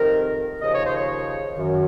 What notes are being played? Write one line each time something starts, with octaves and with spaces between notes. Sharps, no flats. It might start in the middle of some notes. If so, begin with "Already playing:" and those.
Already playing: F2 C3 D#3 A#4
D#2 C#3 F3 D#5
C#5
C5
C#5
F#2 D#3